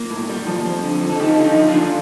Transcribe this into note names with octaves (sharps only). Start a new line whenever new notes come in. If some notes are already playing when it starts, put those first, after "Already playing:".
Already playing: A#3 F4
A2
G3
F3
C4
D3
F3
A4
F3 D#4 G4
D3 F4
D#4 G4
F3
D4 F4
D3